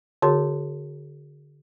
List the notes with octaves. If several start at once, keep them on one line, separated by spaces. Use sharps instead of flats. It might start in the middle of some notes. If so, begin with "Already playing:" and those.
D3 F#4 G#4 C#5 C6